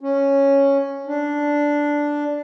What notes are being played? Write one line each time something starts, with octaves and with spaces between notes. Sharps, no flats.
C#4
D4